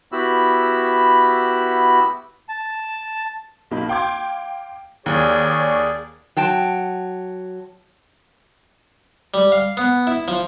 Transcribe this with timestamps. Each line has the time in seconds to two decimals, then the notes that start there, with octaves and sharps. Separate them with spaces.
0.12 B3 E4 F#4 G4 B5 E6
2.49 A5
3.71 B1 A#3 D#4 B5
3.89 F5 G5 C6 D6 G6 G#6
5.06 D#2 G#4 C#5 D5
6.37 F#3 G5 A5
9.34 G3
9.52 F5
9.77 B3
10.07 E4
10.28 F3